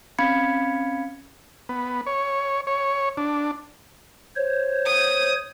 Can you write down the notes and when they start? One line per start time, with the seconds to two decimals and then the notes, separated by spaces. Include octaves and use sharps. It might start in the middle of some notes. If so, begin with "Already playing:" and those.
0.19 C4 C#4 F5 B5 G#6 C#7
1.69 B3
2.06 C#5
2.67 C#5
3.17 D4
4.36 C5 C#5
4.86 D#6